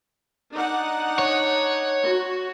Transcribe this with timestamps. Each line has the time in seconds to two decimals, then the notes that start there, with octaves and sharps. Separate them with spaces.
0.54 D4 D#4 F#5
1.19 C#5
2.04 F#4